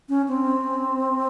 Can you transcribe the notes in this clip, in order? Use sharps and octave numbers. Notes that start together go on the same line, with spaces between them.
C#4
C4